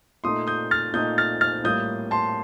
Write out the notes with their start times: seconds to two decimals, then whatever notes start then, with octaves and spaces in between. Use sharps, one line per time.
0.24 A#2 A3 D#4 C6 D#6
0.47 D#6 G6
0.71 F6 A6
0.94 A#2 A3 D#4 D#6 G6
1.18 F6 A6
1.41 F6 A6
1.64 A2 G3 A#3 F4 D#6 G6
2.11 A5 C6